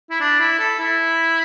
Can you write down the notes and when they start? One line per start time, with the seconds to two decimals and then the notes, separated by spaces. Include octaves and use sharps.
0.10 E4
0.20 D4
0.40 E4
0.59 A4
0.79 E4